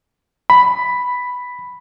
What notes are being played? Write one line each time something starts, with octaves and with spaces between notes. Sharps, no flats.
B5